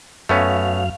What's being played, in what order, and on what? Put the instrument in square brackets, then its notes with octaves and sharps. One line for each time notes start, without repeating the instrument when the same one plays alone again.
[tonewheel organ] F#2 F5 [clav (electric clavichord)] A3 B3 C#4